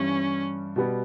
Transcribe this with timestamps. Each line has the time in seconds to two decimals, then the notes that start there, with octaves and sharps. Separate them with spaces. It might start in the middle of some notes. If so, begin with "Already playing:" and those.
Already playing: G2 E3 G3 C#4
0.76 B2 G3 B3